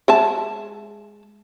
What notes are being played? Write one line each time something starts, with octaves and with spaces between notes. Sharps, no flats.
G#3 E5 A5